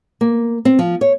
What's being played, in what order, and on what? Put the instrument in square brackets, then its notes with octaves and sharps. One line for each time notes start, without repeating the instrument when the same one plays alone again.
[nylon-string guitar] A#3
C4
F3
C#5